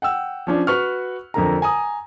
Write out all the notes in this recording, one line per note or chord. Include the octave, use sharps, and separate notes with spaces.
F#5 G5 E6
F3 C#4 D4
F#4 B4 C#6 F6
F2 D3 A#4 A#5
G#5 A#5 D#6